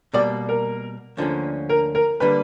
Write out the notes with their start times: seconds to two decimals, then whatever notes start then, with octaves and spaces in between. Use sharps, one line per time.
0.14 B2 G3 A#3 D5
0.49 A#4
1.17 D2 D3 F3 A#3 C#4
1.69 A#4
1.95 A#4
2.20 D3 G3 A#3 B4